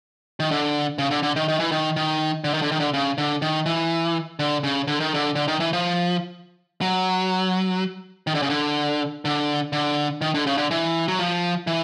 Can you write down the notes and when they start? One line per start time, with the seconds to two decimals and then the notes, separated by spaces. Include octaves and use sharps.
0.40 D#3
0.51 D3
0.98 C#3
1.11 D3
1.23 D3
1.36 D#3
1.48 D#3
1.59 E3
1.72 D#3
1.96 D#3
2.44 D3
2.54 D#3
2.62 D3
2.72 D#3
2.80 D3
2.93 C#3
3.18 D3
3.42 D#3
3.66 E3
4.39 D3
4.63 C#3
4.88 D3
5.00 D#3
5.14 D3
5.36 D3
5.48 D#3
5.60 E3
5.73 F3
6.81 F#3
8.27 D#3
8.34 D3
8.42 C#3
8.50 D3
9.25 D3
9.73 D3
10.21 D#3
10.34 D3
10.46 C#3
10.58 D3
10.71 E3
11.08 F#3
11.19 F3
11.67 E3